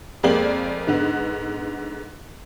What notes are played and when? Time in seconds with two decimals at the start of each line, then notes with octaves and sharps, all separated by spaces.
0.23 F2 G#3 A#3 D5 F#7
0.87 G#2 D3 B3